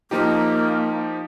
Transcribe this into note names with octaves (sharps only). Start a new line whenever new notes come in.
F3 A#3 D#4 G4